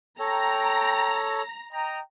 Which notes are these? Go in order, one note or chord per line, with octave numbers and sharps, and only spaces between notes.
A4 C#5 G5 A#5
D#5 G5 A#5